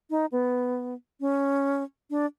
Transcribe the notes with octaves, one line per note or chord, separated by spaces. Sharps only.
D#4
B3
C#4
D4